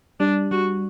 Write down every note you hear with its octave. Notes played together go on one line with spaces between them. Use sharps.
G3 D4
G3 F#4